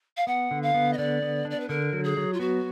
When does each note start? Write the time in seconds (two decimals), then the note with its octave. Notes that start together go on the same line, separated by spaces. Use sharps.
0.17 F5
0.27 B3 F#5
0.51 D3
0.62 F5
0.74 B3
0.93 D#5
0.97 D3 D5
1.22 B3
1.45 D4
1.50 D5
1.60 B4
1.69 D3 A#4
1.93 F#3
2.04 G#4
2.17 F#3
2.33 F4
2.39 B3 F#4